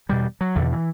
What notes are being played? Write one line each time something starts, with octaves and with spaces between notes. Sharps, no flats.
E2 B2 G3
F#3
E2 B2 D3
E3